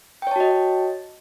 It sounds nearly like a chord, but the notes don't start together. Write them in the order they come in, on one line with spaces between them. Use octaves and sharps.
G5 C#5 A5 F#4 D#5